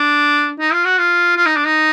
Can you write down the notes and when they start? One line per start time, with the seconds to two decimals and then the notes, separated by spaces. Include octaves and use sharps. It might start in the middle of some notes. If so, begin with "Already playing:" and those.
Already playing: D4
0.60 D#4
0.73 F4
0.85 F#4
0.98 F4
1.36 F4
1.46 D#4
1.56 D4
1.65 D#4